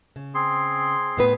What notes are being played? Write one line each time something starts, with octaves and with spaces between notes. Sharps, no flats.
C#3
C4 G#4 C6
A2 B3 B4